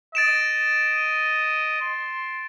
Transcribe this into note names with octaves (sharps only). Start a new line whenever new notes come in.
D#5 A6 D7 E7
C6